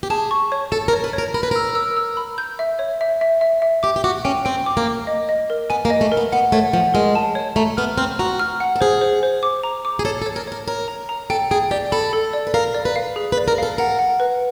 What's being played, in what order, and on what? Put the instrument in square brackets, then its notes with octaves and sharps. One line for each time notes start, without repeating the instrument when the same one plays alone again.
[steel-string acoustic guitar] G4
[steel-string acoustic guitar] G#4 [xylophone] A5
[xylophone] C#6
C#5
[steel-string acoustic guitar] A4 [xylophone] A5
[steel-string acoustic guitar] A#4
[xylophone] C#5
[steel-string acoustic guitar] B4
[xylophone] C#5
[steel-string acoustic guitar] A#4
[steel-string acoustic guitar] A#4 [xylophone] B5
[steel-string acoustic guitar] B4
[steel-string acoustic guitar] A#4 [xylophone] E6
[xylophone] E6
E6
B5
G6
E5
C#5
E5
E5
E5
E5
[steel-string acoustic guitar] G4 [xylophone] D6
[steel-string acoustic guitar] G4
[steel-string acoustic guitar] F#4 [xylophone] D6
[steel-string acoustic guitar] C#4 [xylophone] G5
[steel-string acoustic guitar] C4 [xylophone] G5
[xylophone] D6
[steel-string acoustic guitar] A#3
[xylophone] D6
D#5
D#5
A#4
[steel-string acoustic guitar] B3 [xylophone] G#5
[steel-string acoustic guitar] A#3
[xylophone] D#5
[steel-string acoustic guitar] A3
[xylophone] A#4
[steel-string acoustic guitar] B3
[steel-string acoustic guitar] B3 [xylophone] F#5
[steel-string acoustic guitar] A3 [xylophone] C#5
[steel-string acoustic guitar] F3 [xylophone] F#5
[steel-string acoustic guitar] G#3 [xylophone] A#4
[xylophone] A5
C#5
[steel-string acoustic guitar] A3 [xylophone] A#5
[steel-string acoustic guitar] B3 [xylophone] F6
[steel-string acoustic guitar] C4 [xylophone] F6
[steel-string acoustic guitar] F#4 [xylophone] A#5
[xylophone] F6
F#5
[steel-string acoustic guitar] A4
[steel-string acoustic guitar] G#4 [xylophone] C5
[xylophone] C5
C5
D6
A#5
D6
[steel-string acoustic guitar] G#4
[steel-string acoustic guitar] A4 [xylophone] C#5
[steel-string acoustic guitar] A4
[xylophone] C#5
[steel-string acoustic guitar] A#4
[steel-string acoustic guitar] A#4 [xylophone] C#5
[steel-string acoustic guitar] A#4 [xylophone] C#5
[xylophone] A#5
A#5
[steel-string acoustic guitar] A4 [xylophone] G5
[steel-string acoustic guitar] G#4 [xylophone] G5
[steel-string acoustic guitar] G4 [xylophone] D5
[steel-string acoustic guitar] A4 [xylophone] B5
[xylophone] A4
D5
[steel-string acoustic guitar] B4
[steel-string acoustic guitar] A#4 [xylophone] F5
[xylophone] D5
[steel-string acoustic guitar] B4
[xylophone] F5
G#4
[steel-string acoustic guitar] B4
[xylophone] D5
[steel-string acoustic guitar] A#4
[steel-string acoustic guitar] A4 [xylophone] F5
[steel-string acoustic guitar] A#4 [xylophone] F#5
[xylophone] F#5
B4